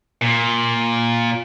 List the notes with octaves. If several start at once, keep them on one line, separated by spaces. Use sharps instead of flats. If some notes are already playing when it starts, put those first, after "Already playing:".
A#2